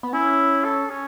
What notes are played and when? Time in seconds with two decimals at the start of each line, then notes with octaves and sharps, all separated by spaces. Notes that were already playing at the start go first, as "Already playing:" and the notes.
0.03 B3
0.13 C#4 E4
0.64 A4
0.90 C#4